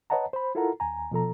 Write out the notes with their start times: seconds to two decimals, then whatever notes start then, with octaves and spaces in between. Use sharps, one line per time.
0.10 B4 C#5 D#5 F#5 A5 A#5
0.33 C5 B5
0.55 E4 F4 A4 A#4 F#5 A#5
0.80 D#2 G#5 A#5
1.11 B2 F3 A4 A#5